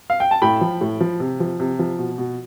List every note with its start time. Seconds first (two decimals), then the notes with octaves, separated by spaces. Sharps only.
0.10 F5
0.20 G5
0.31 A5
0.42 A2 G5 B5
0.61 F3
0.81 A2
1.01 F3
1.20 C3
1.40 F3
1.60 C3
1.79 F3
1.99 B2
2.18 B2